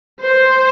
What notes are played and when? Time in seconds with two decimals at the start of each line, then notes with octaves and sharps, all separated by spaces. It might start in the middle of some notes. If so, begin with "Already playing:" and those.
0.21 C5